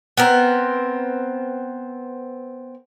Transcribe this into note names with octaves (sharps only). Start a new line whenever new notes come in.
B3 C4 A#4